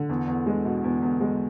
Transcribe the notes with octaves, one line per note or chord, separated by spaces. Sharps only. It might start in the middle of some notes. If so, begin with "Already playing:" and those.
Already playing: D3
E2
E2
G#3
B2
E2
E2
G#3